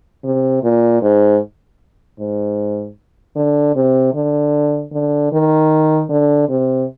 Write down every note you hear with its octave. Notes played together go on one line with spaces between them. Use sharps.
C3
A#2
G#2
G#2
D3
C3
D3
D3
D#3
D3
C3